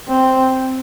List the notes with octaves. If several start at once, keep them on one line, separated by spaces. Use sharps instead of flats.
C4